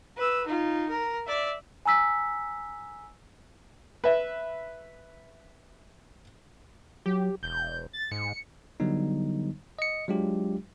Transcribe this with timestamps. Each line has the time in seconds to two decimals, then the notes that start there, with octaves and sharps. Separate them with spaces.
0.17 B4 E6
0.46 D#4 F4
0.90 A#4
1.26 D5 E5
1.85 G#5 A#5 E6 B6
4.04 B4 E5
7.06 F#3 G4
7.43 E1 G6
7.93 A6
8.11 G#2 C#7
8.80 D3 F#3 G3 B3 D#4
9.79 D#5 C#7
10.08 F#3 G#3 D4 F4 G4